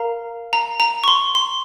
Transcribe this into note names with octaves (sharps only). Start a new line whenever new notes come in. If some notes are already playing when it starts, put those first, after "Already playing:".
Already playing: A#4 F5 A#5
A#5
A#5
C#6
C6
C6